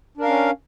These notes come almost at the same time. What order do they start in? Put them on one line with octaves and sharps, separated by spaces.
D4 A#4 F5 C#4